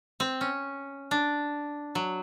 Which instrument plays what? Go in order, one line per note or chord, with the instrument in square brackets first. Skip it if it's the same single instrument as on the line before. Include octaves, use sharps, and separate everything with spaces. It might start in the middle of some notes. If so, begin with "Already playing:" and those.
[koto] C4
C#4
D4
F#3